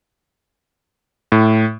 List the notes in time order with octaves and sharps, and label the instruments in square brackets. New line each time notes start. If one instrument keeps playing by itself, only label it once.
[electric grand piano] A2